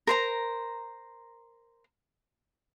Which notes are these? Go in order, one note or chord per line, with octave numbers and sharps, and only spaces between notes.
A#4 C5 A#5